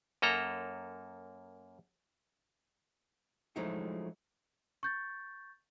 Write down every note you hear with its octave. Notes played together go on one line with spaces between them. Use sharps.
F#2 A#3 A4 A#5
F3 F#3 G#3 A3 D#4 E4
C#6 G6 A6